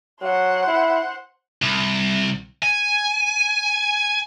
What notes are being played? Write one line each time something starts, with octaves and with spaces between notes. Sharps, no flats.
F#3 C5 F#5
E4
C2
G#5